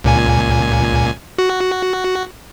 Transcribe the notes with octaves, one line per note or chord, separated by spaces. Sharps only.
C#2 A#2 G#5
F#4